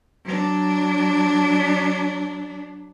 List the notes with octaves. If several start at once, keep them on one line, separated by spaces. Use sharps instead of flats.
F#3 D4